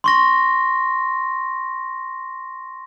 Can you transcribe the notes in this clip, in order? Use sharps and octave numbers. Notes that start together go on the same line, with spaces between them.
C6 C#6 A#6